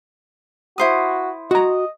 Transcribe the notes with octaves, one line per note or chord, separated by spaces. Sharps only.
E4 F#4 C5 D#6
F#4 D#5 A#5